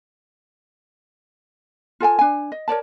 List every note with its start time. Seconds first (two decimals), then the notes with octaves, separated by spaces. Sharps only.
2.00 F4 A4 G5 G#5
2.19 D4 G#5
2.52 D#5
2.68 A#4 C#5 D5 A5